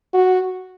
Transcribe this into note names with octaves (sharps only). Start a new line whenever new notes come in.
F#4